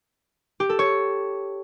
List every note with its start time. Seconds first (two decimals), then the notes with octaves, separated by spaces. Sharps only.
0.60 G4
0.69 A4
0.79 C#5